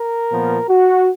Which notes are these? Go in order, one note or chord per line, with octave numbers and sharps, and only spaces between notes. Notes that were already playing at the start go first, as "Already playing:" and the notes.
Already playing: A#4
A#2 F3 B3
F#4